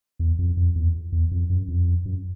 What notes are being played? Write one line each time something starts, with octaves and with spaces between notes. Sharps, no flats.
E2
F2
F2
E2
E2
F2
F#2
F2
F#2